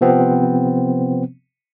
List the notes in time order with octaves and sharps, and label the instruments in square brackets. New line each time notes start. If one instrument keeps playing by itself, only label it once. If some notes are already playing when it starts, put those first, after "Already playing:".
[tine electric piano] C3 F3 B3 C4